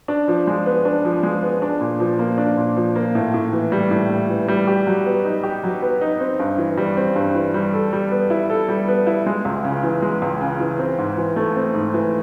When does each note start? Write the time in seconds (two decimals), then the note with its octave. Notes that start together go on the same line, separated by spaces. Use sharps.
0.08 D4
0.28 F3
0.47 G#3
0.66 B3
0.85 D4
1.05 F3
1.23 G#3
1.42 B3
1.62 D4
1.81 A#2
2.00 F3
2.19 A#3
2.38 D4
2.57 A#2
2.76 F3
2.96 A#3
3.15 A2
3.34 A2
3.53 E3
3.72 G3
3.91 A2
4.10 A2
4.30 E3
4.48 G3
4.67 G4
4.87 F#3
5.06 B3
5.25 D#4
5.43 G4
5.63 F#3
5.82 B3
6.01 D#4
6.20 C4
6.40 G2
6.58 E3
6.77 G3
6.97 C4
7.16 G2
7.35 E3
7.54 G3
7.73 A4
7.93 G3
8.11 B3
8.30 E4
8.50 A4
8.69 G3
8.88 B3
9.07 E4
9.26 G#3
9.45 C#2
9.64 C#3
9.83 E3
10.02 G#3
10.22 C#2
10.41 C#3
10.60 E3
10.79 C4
10.98 G#2
11.18 E3
11.36 A3
11.56 C4
11.74 G#2
11.94 E3